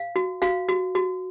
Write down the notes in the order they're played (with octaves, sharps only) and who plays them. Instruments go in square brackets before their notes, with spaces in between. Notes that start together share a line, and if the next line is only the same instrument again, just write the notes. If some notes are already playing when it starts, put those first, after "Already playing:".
Already playing: [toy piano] F5
F#4
F#4 F5
F#4
F#4